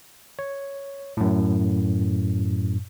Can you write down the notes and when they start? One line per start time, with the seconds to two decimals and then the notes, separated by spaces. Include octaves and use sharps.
0.39 C#5
1.17 F#2 A2